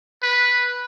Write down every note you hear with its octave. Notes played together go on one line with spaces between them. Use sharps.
B4